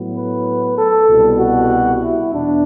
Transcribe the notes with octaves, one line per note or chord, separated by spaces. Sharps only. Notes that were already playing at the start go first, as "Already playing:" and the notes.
Already playing: A2 F#3 B3
B4
A4
C2 B2 G3
F#4
E4
E2 B2 D4